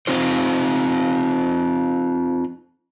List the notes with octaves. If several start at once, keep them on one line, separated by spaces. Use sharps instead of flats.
C4 D#4 F4 C5